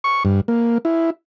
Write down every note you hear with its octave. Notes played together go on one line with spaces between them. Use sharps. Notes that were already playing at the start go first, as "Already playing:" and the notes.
C#6
G2
A#3
E4